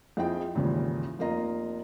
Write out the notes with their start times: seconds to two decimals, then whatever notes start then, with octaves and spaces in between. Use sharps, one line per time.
0.17 F2 F3 E4 G#4 D#5 G5
0.55 G#1 D#2 C#3 E3 F3
1.19 F1 A#3 F4 D#5 A#5